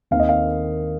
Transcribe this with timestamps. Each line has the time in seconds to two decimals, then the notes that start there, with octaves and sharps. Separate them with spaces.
0.11 D#2 D#3 C4 F5
0.20 D#5
0.29 F5